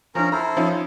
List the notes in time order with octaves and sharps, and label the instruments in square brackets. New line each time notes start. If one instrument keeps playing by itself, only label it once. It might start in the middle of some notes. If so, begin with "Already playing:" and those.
[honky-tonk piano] F3 D4 [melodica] C#4 A#4 A#5
[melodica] E4 A4 C5 [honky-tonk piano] A#5
[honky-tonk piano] F3 C#4 D#4